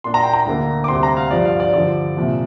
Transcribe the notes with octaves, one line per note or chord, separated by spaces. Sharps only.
A#2 A#3 D4 C6
A#5
G5
A#5
D2 D3 A#3
D6
D2 C3 G3 C4 C6
A#5
F5
G2 F3 D4 D5
F5
D5
G2 D3 F3 D5
C2 A#2 F3